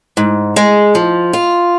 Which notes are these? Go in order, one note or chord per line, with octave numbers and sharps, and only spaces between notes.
G#2
G#3
F3
F4